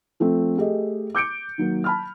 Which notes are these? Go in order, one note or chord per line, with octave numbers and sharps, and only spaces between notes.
F3 A3 C4
A3 G4 G#4 D#5
D6 G6 C#7 D7
D#3 F#3 A#3
A5 B5 F6